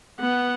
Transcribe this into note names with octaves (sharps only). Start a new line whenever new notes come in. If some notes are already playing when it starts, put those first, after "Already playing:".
B3 F#5